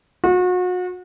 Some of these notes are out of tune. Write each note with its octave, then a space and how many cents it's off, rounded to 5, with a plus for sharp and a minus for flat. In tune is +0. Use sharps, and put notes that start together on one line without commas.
F#4 -35